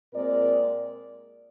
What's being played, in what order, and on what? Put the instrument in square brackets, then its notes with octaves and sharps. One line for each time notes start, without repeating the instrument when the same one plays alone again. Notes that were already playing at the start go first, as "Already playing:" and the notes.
[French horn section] A#2 G#3 C4 A#4 D5